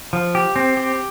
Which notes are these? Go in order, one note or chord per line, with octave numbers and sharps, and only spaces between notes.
F3
G4
C4
G4